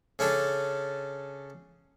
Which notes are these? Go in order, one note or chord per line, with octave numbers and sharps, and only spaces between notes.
C#3 C#4 D4 A4